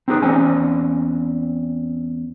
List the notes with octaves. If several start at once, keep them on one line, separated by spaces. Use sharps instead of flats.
C4 D#4 G4 G#4 B4
E2 A#3 C4 C#4 G#5